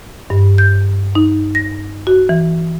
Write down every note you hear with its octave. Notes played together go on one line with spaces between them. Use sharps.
G2
G6
D#4
A#6
F#4
E3